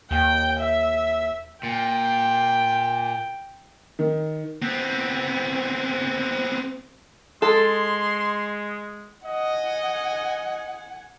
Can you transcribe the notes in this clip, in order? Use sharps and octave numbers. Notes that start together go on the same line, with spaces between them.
D#2 G5
E5
A#2 G5
D#3
B3 C4
G#3 A4 C6
D#5 F#5 G#5